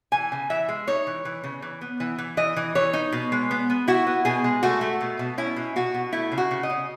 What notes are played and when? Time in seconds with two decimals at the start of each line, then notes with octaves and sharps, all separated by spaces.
0.12 E3 G#5
0.32 C#3
0.50 E3 E5
0.69 G#3
0.88 D#4 C#5
1.07 E3
1.25 E3
1.44 C#3
1.62 E3
1.81 B3
2.00 E3
2.18 E3
2.37 E3 D#5
2.56 E3
2.75 E3 C#5
2.93 D#4
3.12 B2
3.32 G#3
3.51 B3
3.70 B3
3.88 E4 F#4
4.07 B3
4.25 B2 G#4
4.44 G#3
4.63 A3 F#4
4.81 A3
5.01 B2
5.19 B2
5.38 C#4 E4
5.56 B2
5.76 B2 F#4
5.94 B2
6.13 A3 E4
6.32 C#3
6.38 F#4
6.51 C#3
6.63 D#5
6.70 C#3